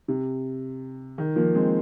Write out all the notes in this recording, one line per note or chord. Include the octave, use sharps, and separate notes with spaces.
C3
D#3
F3 A#3
G#3 C4